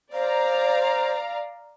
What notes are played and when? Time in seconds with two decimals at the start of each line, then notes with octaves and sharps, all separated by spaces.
0.13 C5 D5 F5 A#5